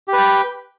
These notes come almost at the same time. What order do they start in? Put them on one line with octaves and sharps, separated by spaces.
G4 B4 G5